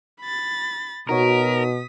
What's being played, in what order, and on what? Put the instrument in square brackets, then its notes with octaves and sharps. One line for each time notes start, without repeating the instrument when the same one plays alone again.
[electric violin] B5 A6
[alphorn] B2 [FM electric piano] D#4 F#4 C#5 [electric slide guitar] A#4 [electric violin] D#6 B6